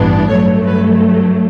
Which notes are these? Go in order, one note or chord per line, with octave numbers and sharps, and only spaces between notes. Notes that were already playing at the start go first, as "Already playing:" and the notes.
Already playing: A1 G2 E3 B3 D4
G2 F#3 A3 C#5
B4